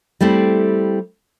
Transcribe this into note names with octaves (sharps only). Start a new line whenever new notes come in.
G3 A3 C4 E4